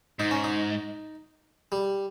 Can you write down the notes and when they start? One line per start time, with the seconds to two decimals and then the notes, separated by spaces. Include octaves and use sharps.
0.19 G#2 D#4
0.31 C#4
0.44 D#4
1.72 G3